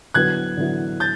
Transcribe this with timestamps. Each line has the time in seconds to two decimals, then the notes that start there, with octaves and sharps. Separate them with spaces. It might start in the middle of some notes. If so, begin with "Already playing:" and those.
0.14 D3 F#3 B3 E4 F#6 G#6
0.57 D3 F#3 B3 E4
1.00 G6 A6